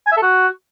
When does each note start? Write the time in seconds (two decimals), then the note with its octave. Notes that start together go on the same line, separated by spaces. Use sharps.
0.07 G#5
0.12 E5
0.17 A4
0.23 F#4